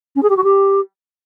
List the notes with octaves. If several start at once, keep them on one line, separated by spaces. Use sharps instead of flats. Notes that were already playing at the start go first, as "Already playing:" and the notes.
C#4
G#4
G4
F#4
G4